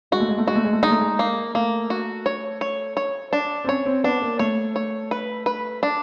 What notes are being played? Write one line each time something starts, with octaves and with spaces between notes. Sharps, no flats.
G#3 F#4
A3
G#3
A3
G#3 F#4
A3
G#3
A3
G#3 D#4
A3
G#3
A#3
A3 A#3
F#4
C#5
C#5
C#5
D4
C4
C#4 C#5
C4
B3 D4
A#3
A3 C#5
C#5
B4
B4
D4